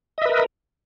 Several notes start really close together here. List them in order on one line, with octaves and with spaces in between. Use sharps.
D#5 E5 B4 A#4